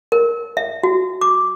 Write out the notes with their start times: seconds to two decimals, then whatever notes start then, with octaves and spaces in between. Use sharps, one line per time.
0.12 A#4
0.57 E5
0.83 F#4
1.21 D6